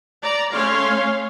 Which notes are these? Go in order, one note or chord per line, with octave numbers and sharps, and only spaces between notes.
D5 A#5
A3 C#4 C#5 F5 C6